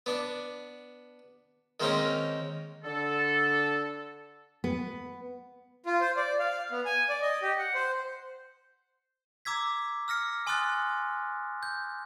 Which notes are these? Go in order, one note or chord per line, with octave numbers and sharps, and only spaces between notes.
B3 D4
D#3 G#3 A#3 C4 C#4 D#4
D3 A4
B3
F4
C5
D5
F5
B3
G#5
D5
D#5
G4
F#5
C5
A#5 D6 E6 G#6 B6
E6 F6 A#6 C#7
G#5 C6 D#6 F6 F#6 A6
G6